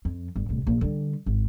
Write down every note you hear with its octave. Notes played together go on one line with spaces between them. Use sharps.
F2
G1
D1 C2
A#1
D3 G3
G#1